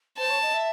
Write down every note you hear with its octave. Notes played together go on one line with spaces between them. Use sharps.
C5 A5
C#5
D#5
E5